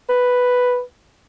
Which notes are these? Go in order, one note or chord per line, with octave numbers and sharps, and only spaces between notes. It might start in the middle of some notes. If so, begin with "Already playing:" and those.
B4